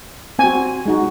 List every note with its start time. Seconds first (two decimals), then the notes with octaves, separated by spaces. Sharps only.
0.39 C4 F#4 G#5
0.86 G#3 D#4 F#4